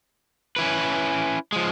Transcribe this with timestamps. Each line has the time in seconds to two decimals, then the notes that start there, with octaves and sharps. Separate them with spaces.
0.56 C#4 E4 B4
1.52 F3 G#3